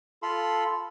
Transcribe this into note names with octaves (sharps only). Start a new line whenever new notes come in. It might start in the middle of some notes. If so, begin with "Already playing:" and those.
F4 A4 B5 C6